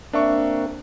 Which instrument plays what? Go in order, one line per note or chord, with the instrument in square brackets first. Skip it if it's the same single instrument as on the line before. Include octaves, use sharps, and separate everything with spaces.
[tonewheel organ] A#3 C4 A#4 [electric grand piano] D4 E5 C#6